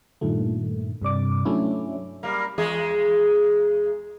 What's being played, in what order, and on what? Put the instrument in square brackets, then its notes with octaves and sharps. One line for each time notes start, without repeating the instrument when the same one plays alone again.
[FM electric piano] G2 A#2 D#3 A3
G2 C3 D5 D6
F#3 A3 C#4 D4 E4
[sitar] G3 A#3
E2 G#3 G#4